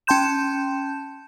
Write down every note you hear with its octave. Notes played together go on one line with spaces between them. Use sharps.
C#4 G5 A5 C6 G6 E7